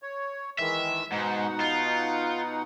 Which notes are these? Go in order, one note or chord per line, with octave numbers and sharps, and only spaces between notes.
C#5
D#3 E3 G#3 E5
G#2 B2 D#4 F#5
F4